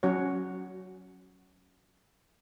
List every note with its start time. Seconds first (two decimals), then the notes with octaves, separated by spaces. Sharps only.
0.03 F#3 C#4 F#4 C#5